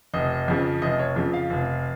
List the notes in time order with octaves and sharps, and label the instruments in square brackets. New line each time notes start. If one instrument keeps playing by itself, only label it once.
[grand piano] F1 D#5
F2 C#3 F3
F1 D#5
C#5
F2 C#3 F3
F5
F1